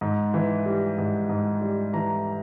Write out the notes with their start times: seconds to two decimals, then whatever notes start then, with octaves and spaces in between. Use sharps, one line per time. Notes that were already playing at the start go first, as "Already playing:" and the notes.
0.01 G#2
0.34 E3
0.66 G3
0.98 G#2
1.29 G#2
1.61 G3
1.93 E3 A#5